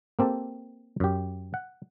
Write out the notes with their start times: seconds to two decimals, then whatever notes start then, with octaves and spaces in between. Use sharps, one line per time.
0.19 A#3 C4 G4 A4
1.00 F#2 G4
1.54 F#5